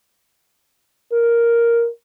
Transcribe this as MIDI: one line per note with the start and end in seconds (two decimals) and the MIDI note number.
1.12 1.88 70